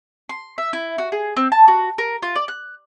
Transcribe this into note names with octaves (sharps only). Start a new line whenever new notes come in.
C6
E5
E4
F#4
G#4
C4
A5
F#4
A#4
F4
D5
F#6